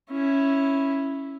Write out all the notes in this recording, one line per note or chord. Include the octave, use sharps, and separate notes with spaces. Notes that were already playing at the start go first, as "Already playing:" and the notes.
C#4 E4